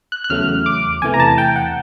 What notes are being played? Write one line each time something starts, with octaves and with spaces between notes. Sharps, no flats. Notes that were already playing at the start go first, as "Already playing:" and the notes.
F#6
F#6
E2 C#3 F#3 A3 F6
D6
E2 C3 E3 A3 G#5
A#5
A5
G5
F#5